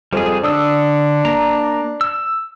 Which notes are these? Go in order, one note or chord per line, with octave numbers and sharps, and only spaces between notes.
F2 G3 G#3 G#4
D3 D4 D#6 E6
A#3 A#5
E6